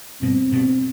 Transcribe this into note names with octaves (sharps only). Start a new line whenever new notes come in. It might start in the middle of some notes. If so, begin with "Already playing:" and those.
G2 B2 C4
G2 B2